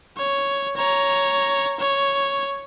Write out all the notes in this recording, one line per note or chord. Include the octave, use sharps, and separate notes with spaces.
C#5
C#5 A#5
C#5